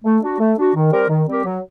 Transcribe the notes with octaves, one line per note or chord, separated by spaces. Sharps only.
A3
D4 F#4
A3
D4 F#4
D#3
G3 C4 G4 A#4
D#3
G3 C4 G4 A#4
F#3